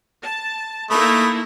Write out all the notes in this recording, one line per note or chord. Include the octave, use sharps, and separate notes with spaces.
A5
A3 A#3 D#4 E4 B5 D#6